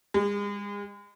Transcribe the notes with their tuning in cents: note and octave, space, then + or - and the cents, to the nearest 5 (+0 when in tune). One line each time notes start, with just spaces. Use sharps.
G#3 -40